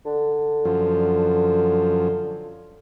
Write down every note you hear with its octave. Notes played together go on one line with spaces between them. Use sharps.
D3
F#2 F3